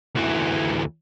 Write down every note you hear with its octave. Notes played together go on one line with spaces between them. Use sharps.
D2 E3